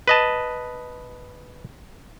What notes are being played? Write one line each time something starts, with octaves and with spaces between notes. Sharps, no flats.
B4 D#5 A5